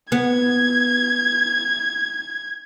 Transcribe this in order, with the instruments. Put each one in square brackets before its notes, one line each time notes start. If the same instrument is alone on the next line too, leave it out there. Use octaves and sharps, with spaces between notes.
[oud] B3 [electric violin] G#6